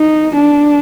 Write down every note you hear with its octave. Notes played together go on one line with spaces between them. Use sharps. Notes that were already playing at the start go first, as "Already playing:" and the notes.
Already playing: D#4
D4